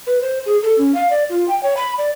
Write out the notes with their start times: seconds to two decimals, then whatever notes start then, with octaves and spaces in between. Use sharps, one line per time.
0.07 B4
0.21 C5
0.46 G#4
0.63 A4
0.78 C#4
0.94 F5
1.10 D5
1.30 F4
1.48 G5
1.63 C#5
1.77 B5
1.98 D5